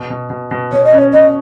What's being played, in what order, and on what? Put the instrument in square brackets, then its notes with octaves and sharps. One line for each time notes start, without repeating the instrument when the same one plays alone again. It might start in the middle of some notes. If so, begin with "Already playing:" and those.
Already playing: [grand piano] B2
B2
B2
B2
[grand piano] B2 [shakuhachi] C#5
[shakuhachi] D#5
[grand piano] C#4
[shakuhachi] C#5
[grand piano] B2 [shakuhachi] D#5